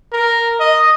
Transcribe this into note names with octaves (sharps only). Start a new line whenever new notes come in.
A#4
D#5